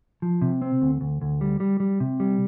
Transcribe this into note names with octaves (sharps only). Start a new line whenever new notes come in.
F3
C3
C4
D2
D2
D2
G3
G3
G3
C3
G3